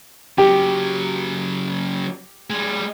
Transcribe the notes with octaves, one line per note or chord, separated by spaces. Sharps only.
C#3 F#3 G4
G3 G#3